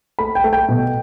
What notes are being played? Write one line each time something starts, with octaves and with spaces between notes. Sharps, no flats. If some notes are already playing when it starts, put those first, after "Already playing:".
A3 B5
G5
A3
G5
B2